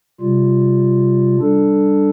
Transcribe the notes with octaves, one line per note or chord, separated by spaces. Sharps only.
C3 G3 F4
G3 D4 A4